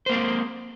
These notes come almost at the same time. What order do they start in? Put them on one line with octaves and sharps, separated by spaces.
C5 A#3 C4 G#3